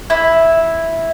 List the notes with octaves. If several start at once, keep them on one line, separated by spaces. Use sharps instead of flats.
E4